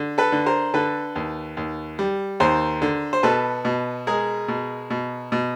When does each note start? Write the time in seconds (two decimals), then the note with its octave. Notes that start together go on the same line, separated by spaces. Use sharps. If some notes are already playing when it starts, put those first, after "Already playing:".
Already playing: D3
0.18 A4 B4
0.32 D3
0.46 A#4 C5
0.74 D3 A4 B4
1.16 D#2
1.57 D#2
1.99 G3
2.40 D#2 A#4 C5
2.82 D3
3.13 C5
3.23 B2 A4 B4
3.65 B2
4.07 G#3 G#4 A#4
4.48 B2
4.90 B2
5.32 B2